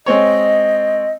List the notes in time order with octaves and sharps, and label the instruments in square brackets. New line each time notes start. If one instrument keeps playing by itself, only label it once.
[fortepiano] G#3 C4 C#5 [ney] D#5